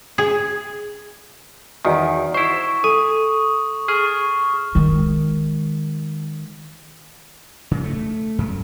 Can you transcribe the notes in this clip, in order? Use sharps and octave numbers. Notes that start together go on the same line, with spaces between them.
G#4
E2 D#3 F#4 D#5 F#5
E4 C5 C#6 E7
A4 G#5 D#6
G#4 C#6 F6
D#3 G#3
C#3
A3
F#2